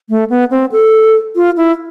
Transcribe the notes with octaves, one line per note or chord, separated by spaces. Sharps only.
A3
B3
C4
A4
F4
E4